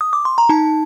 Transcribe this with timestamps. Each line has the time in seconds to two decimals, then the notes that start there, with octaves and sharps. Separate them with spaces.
0.01 D#6
0.13 D6
0.25 C6
0.38 A#5
0.49 D#4 A5